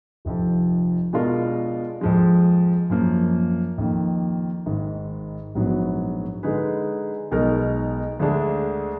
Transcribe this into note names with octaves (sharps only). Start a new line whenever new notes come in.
F1 F2 F3
B2 G#3 D4 F4 A#4
F2 F3 G#3
F#2 F3 A#3
F2 D#3 A#3
G#1 G#2 D#3
A#1 G#2 F#3 B3
D3 G#3 D#4 G#4 B4
B1 B2 G#3 D#4 A#4
D2 D3 G#3 D4 G#4